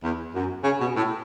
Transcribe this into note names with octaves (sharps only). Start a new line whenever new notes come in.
E2
F#2
C#3
B2
A2